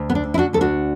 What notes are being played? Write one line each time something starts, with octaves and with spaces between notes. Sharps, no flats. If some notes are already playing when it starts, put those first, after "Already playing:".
Already playing: D2
B3
D4
D3
E4
D4 F#4
D2 A4
D4 F#4